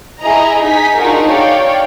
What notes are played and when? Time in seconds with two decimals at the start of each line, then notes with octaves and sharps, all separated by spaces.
0.21 E4 G#4 D#5 A#5
0.63 D#4 G#5 B6
0.98 D4 D#4 F4 F#4 G#4 A#4
1.29 C#5 D5 F5 G5